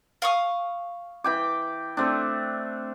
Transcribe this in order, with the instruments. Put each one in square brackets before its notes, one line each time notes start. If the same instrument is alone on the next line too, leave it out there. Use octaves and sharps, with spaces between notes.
[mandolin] F5 C#6 D#6
[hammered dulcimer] E3 G5 D6
A3 C4 D4